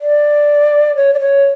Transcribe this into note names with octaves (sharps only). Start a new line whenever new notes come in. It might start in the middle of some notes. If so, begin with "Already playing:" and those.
D5
C#5
D5
C#5